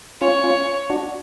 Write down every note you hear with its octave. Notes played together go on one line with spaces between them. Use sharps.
C#4 F4 C#5
C#4 F4
D4 F#4